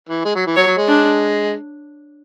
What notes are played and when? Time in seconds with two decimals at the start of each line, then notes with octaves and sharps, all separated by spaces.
0.09 E3
0.25 G#3
0.36 F#3
0.46 E3
0.56 F#3 C#5
0.67 F#3
0.78 G#3
0.88 D4